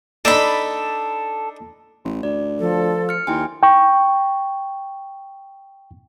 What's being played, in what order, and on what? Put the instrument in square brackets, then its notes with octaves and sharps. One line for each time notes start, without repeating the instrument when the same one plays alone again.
[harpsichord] D4 D#4 D5 [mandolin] A4 B5
[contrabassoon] A1
[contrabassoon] D2 [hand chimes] D5
[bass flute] F3 [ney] A4
[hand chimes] F6 C#7
[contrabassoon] D#2 [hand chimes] E4 G5 G#5 [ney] C6
[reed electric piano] G5 C#6